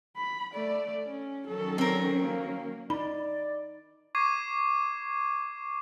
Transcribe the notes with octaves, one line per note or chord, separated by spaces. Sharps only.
B5
A3 D5
C#4
D#3 F#3 C#4 A4
C4 A#4
A#3
D#4 D5 B5
C#6 D6 G#6 C7 D#7